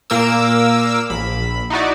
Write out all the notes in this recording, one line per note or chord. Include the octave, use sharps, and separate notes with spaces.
A#2 A#3 A#4 D6 E6
A#1 B5
D#4 E4 F#4 D5